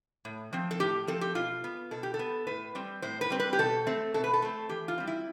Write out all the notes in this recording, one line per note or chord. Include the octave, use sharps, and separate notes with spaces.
A2
F3 C4
A4
A2 G4
F3 C4 A4
G4
B2 F4
B3
B2 A4
G4
A4
B3
A2 B4
G3 C4
A2 C5
B4
G3 C4
B4
G4
B2 A4
A3 C4
B2 A4
B4
A4
A3 C4
E3 G4
F4
G3 C4
E4